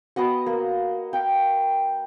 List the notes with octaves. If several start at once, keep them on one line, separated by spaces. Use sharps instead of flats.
B3 F#4 D#5 F#5
A#3
F5 G5